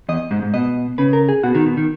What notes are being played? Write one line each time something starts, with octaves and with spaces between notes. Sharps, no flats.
E2 D#5
G#2
G#2
B2 D#5
C#3 B4
A#4
G#4
B2 F#4
D#3
B2
D#3